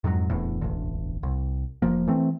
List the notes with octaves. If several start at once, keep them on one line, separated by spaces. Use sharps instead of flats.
F2 G#2 C#3 F#3
D1 E2 A2
E1 A1 D2
C2
F1 F3 A#3
E3 A3 C4